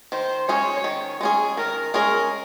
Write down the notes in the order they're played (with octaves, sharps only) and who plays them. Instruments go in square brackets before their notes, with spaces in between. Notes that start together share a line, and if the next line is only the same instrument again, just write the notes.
[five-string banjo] D#3 [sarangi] C5
[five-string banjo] G#3 C#4 G#4 [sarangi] C#5
[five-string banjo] D#3
G#3 C#4 G#4
[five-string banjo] D#3 [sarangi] A#4
[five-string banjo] G#3 C#4 G#4 [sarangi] A#4